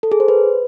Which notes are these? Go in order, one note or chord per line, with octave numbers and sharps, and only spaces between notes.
A4
G#4
C5
B4